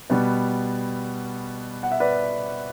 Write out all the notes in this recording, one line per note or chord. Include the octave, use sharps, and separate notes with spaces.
B2 G3 B3
F#5
E5
B4 D5